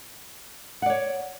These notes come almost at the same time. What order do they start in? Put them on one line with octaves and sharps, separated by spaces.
F#5 D5 C#5